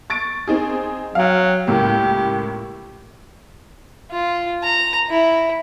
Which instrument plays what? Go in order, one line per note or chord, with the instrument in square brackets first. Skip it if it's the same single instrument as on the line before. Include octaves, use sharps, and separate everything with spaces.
[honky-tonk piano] C#6 A6 D7
C4 D#4 G#4
[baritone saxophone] F#3 [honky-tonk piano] F5 G5
[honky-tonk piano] C#2 A2 A#3 [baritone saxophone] G4
[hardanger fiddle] F4
A#5
E4